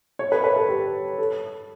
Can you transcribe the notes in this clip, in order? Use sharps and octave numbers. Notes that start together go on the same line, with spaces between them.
C#5
B4
B4
A4
G4
A4